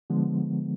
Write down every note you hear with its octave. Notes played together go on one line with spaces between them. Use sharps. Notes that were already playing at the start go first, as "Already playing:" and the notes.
D3 F3 G#3 B3